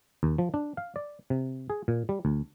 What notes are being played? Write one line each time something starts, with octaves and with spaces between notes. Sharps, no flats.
D#2
F3
D4
F5
D5
C3
G#4
A#2
G3
D2